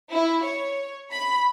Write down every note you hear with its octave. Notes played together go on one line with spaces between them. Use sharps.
E4
C#5
B5